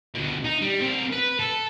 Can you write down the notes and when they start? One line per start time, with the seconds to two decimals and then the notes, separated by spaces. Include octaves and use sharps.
0.15 D2 B2
0.45 D#4
0.62 G3
0.82 C4 A#4
1.13 B4
1.39 A4